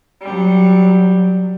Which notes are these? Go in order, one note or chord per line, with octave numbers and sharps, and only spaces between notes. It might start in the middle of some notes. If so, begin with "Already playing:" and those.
F#3 G3